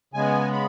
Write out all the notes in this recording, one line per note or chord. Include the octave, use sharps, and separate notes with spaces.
C#3 G#3 B3 G#5
B5